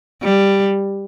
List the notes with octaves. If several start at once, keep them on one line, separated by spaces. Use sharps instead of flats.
G3